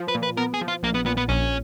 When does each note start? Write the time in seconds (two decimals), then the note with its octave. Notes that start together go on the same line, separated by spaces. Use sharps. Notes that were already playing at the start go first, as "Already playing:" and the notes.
Already playing: F3
0.08 B4
0.15 A#2
0.23 B4
0.37 B3 A#4
0.54 G#4
0.61 F3
0.68 F4
0.83 A#1 A#3
0.94 B3
1.06 A#2 B3
1.17 B3
1.29 A#1 C#4